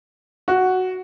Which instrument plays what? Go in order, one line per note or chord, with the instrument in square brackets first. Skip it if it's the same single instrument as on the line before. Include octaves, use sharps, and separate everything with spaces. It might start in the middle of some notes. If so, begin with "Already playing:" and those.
[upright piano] F#4